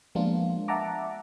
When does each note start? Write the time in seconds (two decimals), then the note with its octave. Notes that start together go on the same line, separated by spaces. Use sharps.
0.15 F3 G#3 A#3 B3 D4 F4
0.68 E5 F#5 A5 A#5 D6